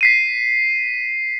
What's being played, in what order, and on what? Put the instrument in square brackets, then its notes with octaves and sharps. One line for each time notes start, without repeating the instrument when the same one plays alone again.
[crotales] B6 C7 D#7